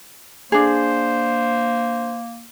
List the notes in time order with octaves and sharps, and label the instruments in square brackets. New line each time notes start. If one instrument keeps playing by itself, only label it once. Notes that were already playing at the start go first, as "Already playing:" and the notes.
[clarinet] A#3 [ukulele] D4 G#4 [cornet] C5